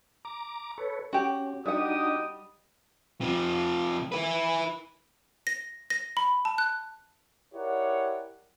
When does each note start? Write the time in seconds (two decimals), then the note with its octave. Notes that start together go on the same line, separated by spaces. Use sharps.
0.25 A#5 D6
0.78 A4 B4 C#5
1.13 C#4 F#4 G4
1.66 G3 D4 D#4 F#4 G4 D#5 F#5 D#6
3.21 C3 F3
4.12 E4 B4
5.47 A#6
5.90 A#6
6.17 B5
6.45 A5
6.58 F#6
7.54 E4 G4 A#4 C#5 D5 F#5